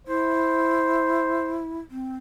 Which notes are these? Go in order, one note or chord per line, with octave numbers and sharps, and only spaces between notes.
E4 C5
C4